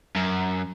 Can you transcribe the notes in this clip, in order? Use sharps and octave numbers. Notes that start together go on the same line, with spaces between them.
F#2